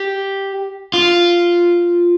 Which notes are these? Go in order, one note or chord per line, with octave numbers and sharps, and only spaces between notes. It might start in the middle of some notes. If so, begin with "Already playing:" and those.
Already playing: G4
F4